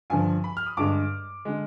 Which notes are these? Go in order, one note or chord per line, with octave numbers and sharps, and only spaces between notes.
G2 D3 F3 G#5
B5
F6
D#6
G2 D3 G#3 D6
D3 G#3